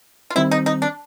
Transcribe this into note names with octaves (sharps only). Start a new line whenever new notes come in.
F4
D#3 G3 C4 E4
D#4
D#4
D4